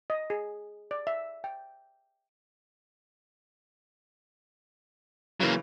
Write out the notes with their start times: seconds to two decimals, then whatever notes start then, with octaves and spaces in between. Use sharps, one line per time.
0.10 D#5
0.30 G#4
0.91 D5
1.07 E5
1.44 G5
5.40 C#3 E3 F#3 A#3